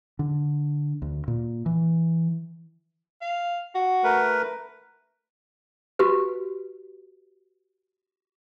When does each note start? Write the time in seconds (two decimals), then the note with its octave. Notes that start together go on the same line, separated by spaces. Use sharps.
0.19 D3
1.02 D2
1.28 A#2
1.66 E3
3.22 F5
3.75 F#4
4.04 A3 A#4 B4
5.99 F#4 G4 B4